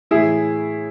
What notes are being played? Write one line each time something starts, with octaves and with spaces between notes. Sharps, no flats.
A2 E3 G#3 E4 G#4